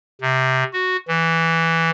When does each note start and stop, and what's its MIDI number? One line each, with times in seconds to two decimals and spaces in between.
0.21 0.64 48
0.73 0.97 66
1.08 1.91 52